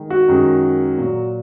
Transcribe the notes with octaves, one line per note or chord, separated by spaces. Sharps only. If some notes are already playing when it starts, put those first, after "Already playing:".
Already playing: D#3 G#3
F#4
F#2 D#3 G#3
A#2 F#3